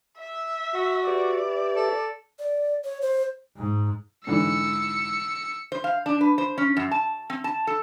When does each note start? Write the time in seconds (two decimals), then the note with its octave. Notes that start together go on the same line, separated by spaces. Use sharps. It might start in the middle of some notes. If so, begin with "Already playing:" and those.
0.18 E5
0.74 F#4
1.07 G4 B4 D5 E5
1.75 A4
2.39 D5
2.84 C#5
3.02 C5
3.57 G#2
4.27 G#2 D3 E3 E6 C#7
5.72 C5
5.84 F5
6.06 D4
6.21 B4
6.38 C5
6.58 C#4
6.77 F#2
6.91 A5
7.30 C4
7.44 A5
7.67 A4